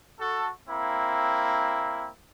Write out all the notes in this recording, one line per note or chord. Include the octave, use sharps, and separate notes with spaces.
F#4 A4
A#3 C4 E4